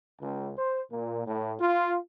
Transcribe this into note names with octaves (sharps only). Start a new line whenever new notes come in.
C#2
C5
A#2
A2
F4